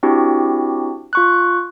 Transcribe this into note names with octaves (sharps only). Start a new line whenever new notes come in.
C4 D4 E4 F#4 G4
F4 C#6 F#6